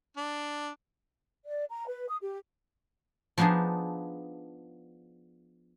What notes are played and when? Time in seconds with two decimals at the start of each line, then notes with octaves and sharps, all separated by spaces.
0.17 D4
1.46 D5
1.70 A#5
1.87 B4
2.09 D#6
2.21 G4
3.38 F3 B3 D4 D#4 G#4